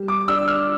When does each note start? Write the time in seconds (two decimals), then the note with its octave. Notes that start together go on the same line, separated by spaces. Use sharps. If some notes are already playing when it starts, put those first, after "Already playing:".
Already playing: G3
0.08 D6
0.28 D4 E6
0.48 F6